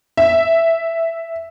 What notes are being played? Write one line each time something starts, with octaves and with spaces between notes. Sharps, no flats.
E5